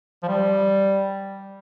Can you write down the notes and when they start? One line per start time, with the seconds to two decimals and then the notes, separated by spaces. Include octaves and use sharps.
0.23 F3
0.28 G3